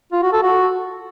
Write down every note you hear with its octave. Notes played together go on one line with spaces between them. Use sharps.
F4
F#4
A4
F#4